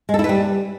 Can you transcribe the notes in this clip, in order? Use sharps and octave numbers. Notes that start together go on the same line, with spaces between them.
G#3
A4
E4
B4
G3